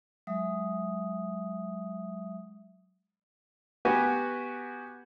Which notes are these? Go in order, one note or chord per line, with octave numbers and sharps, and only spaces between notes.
F#3 G#3 E5 D#6
B3 F#4 G4 B4 G#5